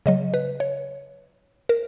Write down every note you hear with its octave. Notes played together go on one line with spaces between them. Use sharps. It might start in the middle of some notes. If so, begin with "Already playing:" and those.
C#3 F#3 D#5
B4
C#5
A#4